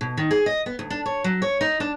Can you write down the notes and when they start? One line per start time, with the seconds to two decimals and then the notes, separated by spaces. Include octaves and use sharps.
0.01 B2
0.17 D#3
0.31 G#4
0.46 D#5
0.66 B3
0.79 D2
0.90 D4
1.06 C#5
1.24 F#3
1.42 C#5
1.61 D#4
1.80 D4